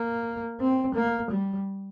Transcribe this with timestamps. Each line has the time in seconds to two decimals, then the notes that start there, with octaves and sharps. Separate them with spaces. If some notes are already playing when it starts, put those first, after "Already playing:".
Already playing: A#3
0.60 C4
0.95 A#3
1.31 G3